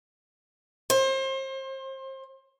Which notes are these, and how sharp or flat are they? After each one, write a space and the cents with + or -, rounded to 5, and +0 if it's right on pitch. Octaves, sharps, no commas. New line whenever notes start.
C5 +30